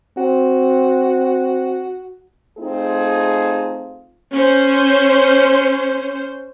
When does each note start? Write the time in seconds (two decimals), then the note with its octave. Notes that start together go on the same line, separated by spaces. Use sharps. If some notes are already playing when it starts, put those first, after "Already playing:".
0.17 C4 F#4
2.57 A3 C4 D#4 F4 G#4
4.34 C#4 C5